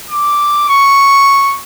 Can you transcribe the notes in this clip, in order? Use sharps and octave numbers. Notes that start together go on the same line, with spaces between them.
D6
C#6